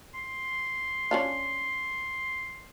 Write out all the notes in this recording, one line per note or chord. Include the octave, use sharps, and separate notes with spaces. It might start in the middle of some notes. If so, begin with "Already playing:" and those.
C6
C#4 D4 F4